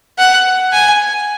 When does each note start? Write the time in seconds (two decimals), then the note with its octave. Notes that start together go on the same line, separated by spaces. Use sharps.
0.18 F#5
0.73 G#5